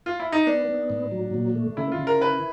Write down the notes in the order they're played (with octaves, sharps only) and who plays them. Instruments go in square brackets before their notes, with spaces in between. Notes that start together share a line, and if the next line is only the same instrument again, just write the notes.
[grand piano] F4
E4
D#4
[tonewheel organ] B3 [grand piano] D4
[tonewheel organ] B3
A2
F#3
A#2
A3
[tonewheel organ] C#3 [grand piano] E4
[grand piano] F4
[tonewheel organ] C#3
[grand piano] A#4
[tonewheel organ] E4 [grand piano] B4